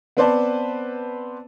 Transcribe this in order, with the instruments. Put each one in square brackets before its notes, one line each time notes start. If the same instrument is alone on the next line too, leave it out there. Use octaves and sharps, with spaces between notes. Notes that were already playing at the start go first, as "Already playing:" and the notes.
[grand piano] B3 C4 B4 C5 D5 A5